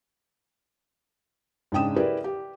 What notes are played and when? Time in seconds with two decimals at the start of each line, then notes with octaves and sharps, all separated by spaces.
1.72 G#2 C#3 D4 G5 D#6 E7
1.96 E4 G4 G#4 A#4 B4 D5
2.24 G4